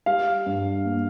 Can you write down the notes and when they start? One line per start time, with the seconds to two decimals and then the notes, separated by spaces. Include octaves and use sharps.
0.06 G3 F5
0.46 G2
0.85 A#3